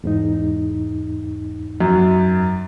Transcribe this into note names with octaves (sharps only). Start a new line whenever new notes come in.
E2 G#2 D#4
F#2